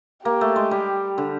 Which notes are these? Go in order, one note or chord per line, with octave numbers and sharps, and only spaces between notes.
A#3 G4
A3
G#3
G3
D3